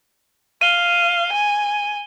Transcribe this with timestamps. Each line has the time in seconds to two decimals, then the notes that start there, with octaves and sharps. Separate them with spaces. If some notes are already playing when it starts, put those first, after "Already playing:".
0.61 F5 D#7 G7
1.33 G#5